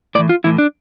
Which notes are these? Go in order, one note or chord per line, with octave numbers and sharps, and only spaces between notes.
A2 E3 D5
F4
A2 E3 E4
D4